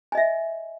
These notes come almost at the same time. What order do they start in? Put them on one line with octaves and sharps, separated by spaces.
G#5 D#5 E5